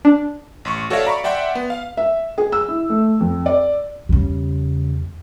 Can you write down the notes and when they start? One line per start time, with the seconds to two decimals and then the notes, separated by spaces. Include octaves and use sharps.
0.05 D4
0.65 A1 C6 C#6
0.90 F#4 A4 C#5 D5 E5 F5
1.05 D5 A#5 B5 C#6
1.24 D5 E5 F#5 G5 C6
1.55 B3
1.70 F5
1.97 E5
2.38 G#4
2.52 E6
2.68 E4
2.90 A3
3.20 F2
3.46 D5
4.09 E2 C#3 G3